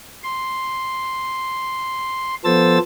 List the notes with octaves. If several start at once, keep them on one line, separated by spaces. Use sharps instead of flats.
C6
F3 B3 A4 C5 E6 A6